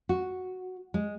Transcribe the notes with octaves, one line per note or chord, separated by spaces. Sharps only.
F#4
G#3